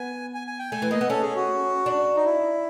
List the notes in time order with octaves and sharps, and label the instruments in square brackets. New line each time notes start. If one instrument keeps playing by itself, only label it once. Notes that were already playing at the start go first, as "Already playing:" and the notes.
Already playing: [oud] B3 [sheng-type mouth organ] G#5
[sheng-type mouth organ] G#5
G#5
G5
[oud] A3 [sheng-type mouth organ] G#5
[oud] E3
[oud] A#3 [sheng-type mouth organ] D#5
[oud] B3
[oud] C#4 [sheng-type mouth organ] A4
[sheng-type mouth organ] G#4
F#4
[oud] D4
[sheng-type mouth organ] D#4
E4